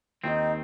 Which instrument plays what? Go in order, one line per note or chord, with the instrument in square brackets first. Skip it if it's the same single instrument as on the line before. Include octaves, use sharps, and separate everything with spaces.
[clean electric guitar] D#2 D#3 C4 [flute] D#4 F4